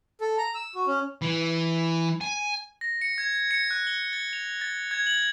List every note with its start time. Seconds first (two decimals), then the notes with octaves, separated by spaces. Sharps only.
0.21 A4
0.38 A#5
0.55 E6
0.75 F#4
0.87 C#4
1.22 E3
2.21 G#5
2.81 A#6
3.01 C#7
3.18 G#6
3.51 C#7
3.71 F#6
3.87 G7
4.13 A6
4.33 F7
4.61 A6
4.91 G#6
5.07 F#7